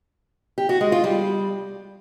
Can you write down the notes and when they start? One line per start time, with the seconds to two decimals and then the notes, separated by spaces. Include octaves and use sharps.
0.58 G4
0.69 F#4
0.81 G#3
0.92 F4
1.04 G3